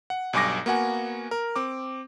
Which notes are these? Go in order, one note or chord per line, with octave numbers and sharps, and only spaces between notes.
F#5
B1 G2 G#5 D6 A#6
A#3 B3 F#4 F#5 G#5
A#4
C4 D6